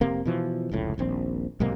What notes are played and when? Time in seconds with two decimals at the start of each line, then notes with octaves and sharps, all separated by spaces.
0.01 F1 C3 A#3
0.25 B2 E3 F3
0.71 F1 C#2 A2
0.98 D#1 A#1 C4
1.60 B1 G#2 C3 A#3